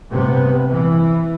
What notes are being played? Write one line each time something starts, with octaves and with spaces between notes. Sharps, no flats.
G2 C3 B3
E3